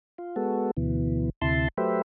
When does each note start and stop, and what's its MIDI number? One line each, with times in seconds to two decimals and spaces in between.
0.18 0.36 65
0.36 0.71 56
0.36 0.71 59
0.36 0.71 66
0.36 0.71 69
0.77 1.30 38
0.77 1.30 47
0.77 1.30 52
1.41 1.68 38
1.41 1.68 48
1.41 1.68 64
1.41 1.68 81
1.41 1.68 84
1.77 2.02 54
1.77 2.02 57
1.77 2.02 67
1.77 2.02 71
1.77 2.02 72
1.77 2.02 76